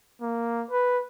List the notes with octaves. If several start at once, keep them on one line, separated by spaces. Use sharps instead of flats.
A#3
B4